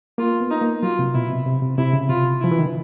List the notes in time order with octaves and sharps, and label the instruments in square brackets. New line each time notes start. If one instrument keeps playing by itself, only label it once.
[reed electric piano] A#3 [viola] F4
[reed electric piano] B3
[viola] D#4
[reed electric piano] A#3
[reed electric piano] F#3 [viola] F4
[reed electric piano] C3
[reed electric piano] B2 [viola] E4
[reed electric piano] C3
C3
C3
[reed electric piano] C3 [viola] E4
[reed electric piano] C#3
[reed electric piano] C3 [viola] F4
[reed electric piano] F3 [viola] E4
[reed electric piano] E3
D#3
D3